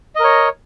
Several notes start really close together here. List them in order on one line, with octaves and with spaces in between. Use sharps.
D#5 A#4 C#5